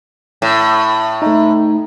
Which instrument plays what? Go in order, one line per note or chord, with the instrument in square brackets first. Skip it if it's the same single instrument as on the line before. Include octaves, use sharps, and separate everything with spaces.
[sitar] A2
[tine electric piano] A3 D#4